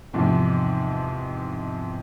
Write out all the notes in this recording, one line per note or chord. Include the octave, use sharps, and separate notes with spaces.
E2 G#2 C3 F3